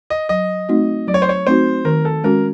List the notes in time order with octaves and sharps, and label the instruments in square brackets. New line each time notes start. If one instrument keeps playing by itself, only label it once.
[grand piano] D#5
[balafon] F#3 [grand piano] D#5
[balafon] A3 C4 D#4 F#4
[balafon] F#3 [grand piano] D5
[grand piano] C#5
C5
C#5
[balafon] A3 C4 D#4 F#4 [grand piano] C5
[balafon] D#3 [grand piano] A#4
[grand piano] A4
[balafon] G#3 C#4 F#4 [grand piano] A#4